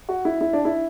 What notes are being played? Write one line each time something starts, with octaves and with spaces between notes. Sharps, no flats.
F#4
E4
E4
D4
E4